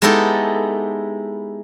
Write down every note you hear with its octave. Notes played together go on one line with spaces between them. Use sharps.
G#3 B3 D#4 E4 G4 A4